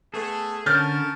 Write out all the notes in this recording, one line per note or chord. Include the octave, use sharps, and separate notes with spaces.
A3 B3 G#4 A4
D3 C#4 A#4 A5 F6 G6 A6